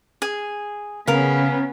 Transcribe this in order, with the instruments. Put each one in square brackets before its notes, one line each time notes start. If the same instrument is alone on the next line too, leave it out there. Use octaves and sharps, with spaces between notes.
[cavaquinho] G#4
[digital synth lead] C#3 [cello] B3 C#4 [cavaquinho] A#4 F5